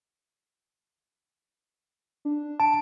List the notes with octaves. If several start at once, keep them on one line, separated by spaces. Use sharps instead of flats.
D4
A5 D7